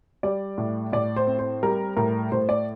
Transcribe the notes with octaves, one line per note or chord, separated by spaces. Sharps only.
G3 D5
A2
A2 D5
C5
C4
C5
G3 A#4
A2 A#4
A2 C5
D5